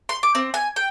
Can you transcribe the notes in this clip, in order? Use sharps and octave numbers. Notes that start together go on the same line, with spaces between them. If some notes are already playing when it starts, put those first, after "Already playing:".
C6
D6
C4
G#5
G5